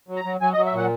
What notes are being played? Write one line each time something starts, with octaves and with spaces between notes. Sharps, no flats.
F#3
A#5
F#3
F#3 G#5
D#5
F#3
E5
A#2 F#5